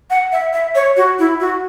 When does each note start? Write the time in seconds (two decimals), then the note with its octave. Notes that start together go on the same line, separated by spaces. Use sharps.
0.10 F#5
0.32 E5
0.53 E5
0.75 C#5
0.96 F#4
1.19 E4
1.40 F#4